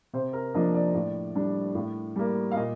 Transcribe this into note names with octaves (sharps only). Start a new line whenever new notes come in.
C3 C5
A#4
F3 A#3 D4 D#5
D5
A2
G3 D4
A2
G3 A#3
F5
A#2 D#5